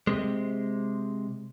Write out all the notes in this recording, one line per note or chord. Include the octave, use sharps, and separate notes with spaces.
C3 G#3